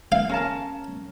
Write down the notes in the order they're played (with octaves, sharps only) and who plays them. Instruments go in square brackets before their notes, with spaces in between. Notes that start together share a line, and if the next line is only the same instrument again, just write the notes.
[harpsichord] F5
[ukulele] C#4 A#4 A5